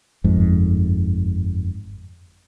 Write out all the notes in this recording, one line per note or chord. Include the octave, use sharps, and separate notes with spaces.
G1 F2 G#2